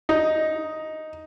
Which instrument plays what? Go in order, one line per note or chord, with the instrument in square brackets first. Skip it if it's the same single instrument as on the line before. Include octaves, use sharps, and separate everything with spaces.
[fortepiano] D#4